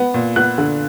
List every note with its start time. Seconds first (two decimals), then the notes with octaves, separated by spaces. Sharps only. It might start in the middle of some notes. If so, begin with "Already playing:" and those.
Already playing: B3
0.14 A#2
0.36 B3 F#6
0.58 D3